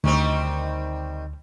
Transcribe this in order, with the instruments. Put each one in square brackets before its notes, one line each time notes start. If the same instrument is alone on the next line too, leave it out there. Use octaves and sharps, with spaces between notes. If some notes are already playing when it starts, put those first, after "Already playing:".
[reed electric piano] D2 [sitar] D#3 G3 C4